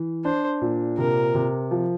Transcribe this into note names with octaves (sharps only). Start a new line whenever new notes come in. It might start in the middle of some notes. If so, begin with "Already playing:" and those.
Already playing: E3
D4 C5
A#2
C3 A#4
C3
F3